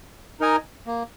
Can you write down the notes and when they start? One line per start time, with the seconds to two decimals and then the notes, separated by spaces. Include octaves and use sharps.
0.40 D#4 A#4 D#5 G#5
0.87 A#3